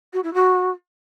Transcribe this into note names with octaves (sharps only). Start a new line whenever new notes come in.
F#4
E4
F#4